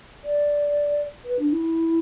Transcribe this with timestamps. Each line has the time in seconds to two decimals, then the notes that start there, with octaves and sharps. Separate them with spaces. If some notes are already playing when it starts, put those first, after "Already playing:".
0.25 D5
1.24 B4
1.39 D4
1.52 E4